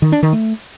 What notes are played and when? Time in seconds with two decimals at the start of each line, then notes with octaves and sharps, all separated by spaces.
0.02 D#3
0.12 D4
0.23 D#3
0.33 A3